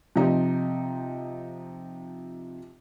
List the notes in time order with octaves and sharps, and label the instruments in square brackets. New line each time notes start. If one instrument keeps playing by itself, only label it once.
[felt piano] C3 F3 D#4